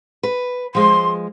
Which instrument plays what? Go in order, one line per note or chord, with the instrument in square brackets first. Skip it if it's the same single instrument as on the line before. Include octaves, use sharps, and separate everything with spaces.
[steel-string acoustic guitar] B4
[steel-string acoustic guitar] F3 G#3 [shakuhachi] C6